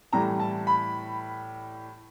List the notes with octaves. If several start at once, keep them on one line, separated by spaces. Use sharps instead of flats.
A2 E3 G3 A#5
A5
B5